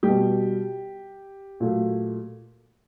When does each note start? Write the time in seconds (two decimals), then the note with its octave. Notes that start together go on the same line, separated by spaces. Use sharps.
0.03 B2 G3 G4
1.60 A#2 F#3 A3